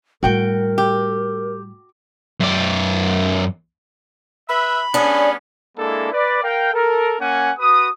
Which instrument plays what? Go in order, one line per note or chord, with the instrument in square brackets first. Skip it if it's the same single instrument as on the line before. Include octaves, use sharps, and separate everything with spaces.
[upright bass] A2 G3 [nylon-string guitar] F#4 G5 [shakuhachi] A#4
[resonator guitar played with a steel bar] G4
[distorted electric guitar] F#2 D5
[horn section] B4 E5 [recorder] B5
[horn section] G3 B3 C#4 [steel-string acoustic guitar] D4 G#4
[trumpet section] G#3 A#3 D4 E4 A4
B4 D5
A#4 F5 G5
A4 A#4
A#3 C#4 F#5 G#5
F#4 B4 D#6